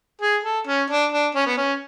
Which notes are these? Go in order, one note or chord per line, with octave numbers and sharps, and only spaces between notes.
G#4
A4
C#4
D4
D4
C#4
B3
C#4